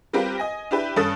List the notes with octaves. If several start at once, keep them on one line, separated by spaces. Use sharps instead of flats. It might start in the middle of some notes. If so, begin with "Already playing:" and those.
G3 C4 F4 G4 A#4 B4
D#5 G#5 A#6
D4 E4 G4 B4
G2 C#4 A4 D#6 A6